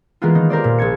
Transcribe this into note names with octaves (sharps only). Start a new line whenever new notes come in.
E3 G#3 A#3 B3 F4
D#3 D#4
G4 A#4 C5 D5
A#2
A#1 A5 G#6 C#7